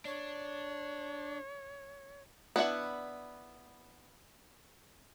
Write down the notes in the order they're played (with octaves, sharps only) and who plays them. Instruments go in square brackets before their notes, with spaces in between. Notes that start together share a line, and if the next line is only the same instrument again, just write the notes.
[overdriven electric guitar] D4 [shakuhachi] C#5
[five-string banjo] B3 D4 E4 F#5